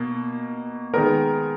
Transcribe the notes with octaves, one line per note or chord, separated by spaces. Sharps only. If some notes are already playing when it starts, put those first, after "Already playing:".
Already playing: B2 A#3
D#3 G#3 B3 A#4